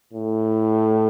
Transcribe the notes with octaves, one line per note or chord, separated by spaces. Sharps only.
A2